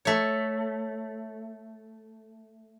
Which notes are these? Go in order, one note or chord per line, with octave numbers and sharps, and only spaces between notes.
A3 C#5